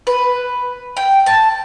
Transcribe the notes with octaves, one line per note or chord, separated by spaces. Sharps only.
B4
G5
A5